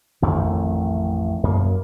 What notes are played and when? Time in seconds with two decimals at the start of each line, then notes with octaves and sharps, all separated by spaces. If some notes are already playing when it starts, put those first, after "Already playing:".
0.22 A1 F2 D#3 A3
1.43 F#2 A#3